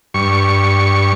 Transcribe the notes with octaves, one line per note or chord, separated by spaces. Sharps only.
G2 C#6